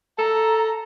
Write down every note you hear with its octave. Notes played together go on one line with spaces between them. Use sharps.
A4 A#5